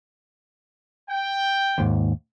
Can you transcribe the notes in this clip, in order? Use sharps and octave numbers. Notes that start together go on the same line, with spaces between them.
G5
D#2 G#2